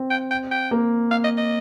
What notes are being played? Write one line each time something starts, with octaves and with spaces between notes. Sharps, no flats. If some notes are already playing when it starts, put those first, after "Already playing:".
Already playing: C4
G5
G5
G5
A#3
F5
D#5
D#5